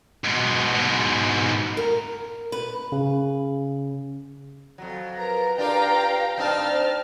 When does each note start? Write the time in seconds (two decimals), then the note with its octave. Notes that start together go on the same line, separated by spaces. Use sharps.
0.24 G#2 B2
0.75 G#2 B2
1.77 A#4
2.52 B4
2.92 C#3
4.78 F2 F#3
5.18 A#4 B4 A#5
5.58 D4 F4 G4 F5 G5 A#5
6.38 G2 C4 D#4 A5 F6
6.72 C5